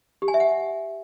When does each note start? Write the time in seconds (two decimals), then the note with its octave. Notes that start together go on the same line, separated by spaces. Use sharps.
0.22 G4
0.28 G#5
0.34 E5
0.40 F#5